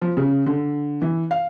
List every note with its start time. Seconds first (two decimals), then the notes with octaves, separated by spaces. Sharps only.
0.02 F3
0.17 C#3
0.46 D3
1.02 E3
1.31 F5